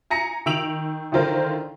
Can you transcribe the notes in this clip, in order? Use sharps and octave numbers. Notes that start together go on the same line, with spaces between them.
G#5 A#5 A#6 C#7
D#3 E6 D7 F7 F#7
D3 D#3 E4 F4 A#4 C5